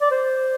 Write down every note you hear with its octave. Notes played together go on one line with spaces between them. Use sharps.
D5
C5